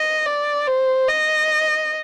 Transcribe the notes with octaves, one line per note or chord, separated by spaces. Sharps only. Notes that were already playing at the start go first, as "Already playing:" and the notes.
Already playing: D#5
D5
C5
D#5